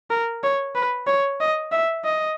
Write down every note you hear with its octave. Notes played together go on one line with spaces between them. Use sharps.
A#4
C#5
B4
C#5
D#5
E5
D#5